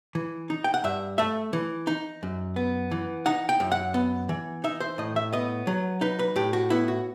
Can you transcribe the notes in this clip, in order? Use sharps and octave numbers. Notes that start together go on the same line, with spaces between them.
E3
D#4
G5
F#5
G2 E5
A3 E5
E3
D#4
F#2
B3
E3
D#4 F#5
G5
F#2
F#5
B3
E3
D#4 E5
C5
A2 D#5
E5
B3 D#5
F#3
D#4 B4
B4
A2 G4
F#4
B3 E4
F#4